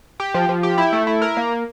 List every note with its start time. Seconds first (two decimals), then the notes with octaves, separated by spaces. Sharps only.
0.20 G4
0.34 F3
0.49 F3
0.63 G4
0.78 E4
0.93 A3
1.07 E4
1.22 A#4
1.37 A#3